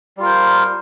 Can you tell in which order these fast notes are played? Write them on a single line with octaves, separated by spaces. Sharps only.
G3 F4 A#4 C5